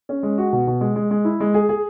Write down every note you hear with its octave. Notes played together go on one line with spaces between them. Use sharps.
C#4
G#3
F#4
B2
B2
G#3
G#3
G#3
E4
G#3
G#4
G#4